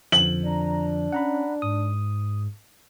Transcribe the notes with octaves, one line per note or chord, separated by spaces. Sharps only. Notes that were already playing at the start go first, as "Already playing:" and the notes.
F2 D3 F3 F#7
D4 A#5
C#4 F#5 A#5 B5
G#2 D#6